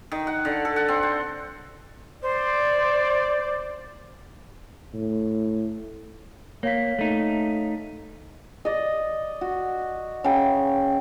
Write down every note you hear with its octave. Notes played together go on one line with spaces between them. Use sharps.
D#3
F#5
D3
A4
F#5
C4
C5
C5 D5
A2
A#3 C#5 F5 B6
A3 D#4
D5 D#5
F#4
C#3 G5